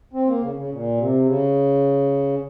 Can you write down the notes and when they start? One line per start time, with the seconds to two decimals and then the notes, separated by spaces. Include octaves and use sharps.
0.13 C4
0.27 A#3
0.42 C#3
0.55 C#3
0.70 A#2
0.97 C3
1.26 C#3